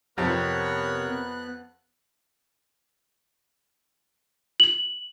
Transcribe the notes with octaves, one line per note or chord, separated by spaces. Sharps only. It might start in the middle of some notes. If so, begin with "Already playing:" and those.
F2 C3 B3 C4 G4 A#4 C#5 F#6
F#7